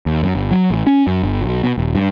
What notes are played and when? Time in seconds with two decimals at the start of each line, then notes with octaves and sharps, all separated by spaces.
0.06 D#2
0.23 F#2
0.35 G1
0.51 F#3
0.70 A1
0.87 C#4
1.07 F#2
1.23 G1
1.42 B1
1.63 B2
1.78 D#1
1.95 G2